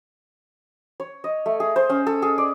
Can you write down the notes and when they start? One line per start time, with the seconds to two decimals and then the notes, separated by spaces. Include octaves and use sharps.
1.00 C#5
1.24 D#5
1.46 A3
1.60 G#4
1.76 C5
1.89 C#4
2.07 A4
2.22 G#4
2.38 D5